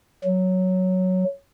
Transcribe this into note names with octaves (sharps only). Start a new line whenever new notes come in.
F#3